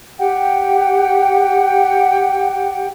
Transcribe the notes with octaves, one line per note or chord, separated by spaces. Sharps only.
G4 F#5 G5